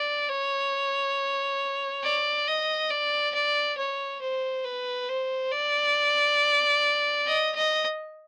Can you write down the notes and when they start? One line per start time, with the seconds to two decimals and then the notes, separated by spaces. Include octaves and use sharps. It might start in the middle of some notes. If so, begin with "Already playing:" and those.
Already playing: D5
0.29 C#5
2.03 D5
2.47 D#5
2.90 D5
3.34 D5
3.78 C#5
4.21 C5
4.64 B4
5.09 C5
5.52 D5
7.26 D#5
7.55 D#5